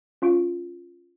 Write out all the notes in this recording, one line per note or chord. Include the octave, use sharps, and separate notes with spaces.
C#4 F4 C#6 D7